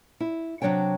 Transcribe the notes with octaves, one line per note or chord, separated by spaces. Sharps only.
E4
C3 F3 F#3 D4 C#5 G5